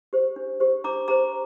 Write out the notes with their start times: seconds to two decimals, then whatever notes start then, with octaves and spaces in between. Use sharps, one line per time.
0.13 G4 C5
0.36 D4
0.60 G4 C5
0.84 D4 A#5 D6
1.08 G4 C5 A#5 D6